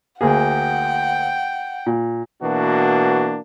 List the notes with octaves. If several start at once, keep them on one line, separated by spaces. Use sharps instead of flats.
D2 A#3 G#4 F#5 G5
A#2
B2 E3 A#3 D4 F#4